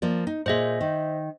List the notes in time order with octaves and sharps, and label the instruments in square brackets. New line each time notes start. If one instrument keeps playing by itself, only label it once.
[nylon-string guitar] F3 A#3 D5
D#4
[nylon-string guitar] A#2 G#4 [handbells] C5 D#5 E5
[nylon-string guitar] D#3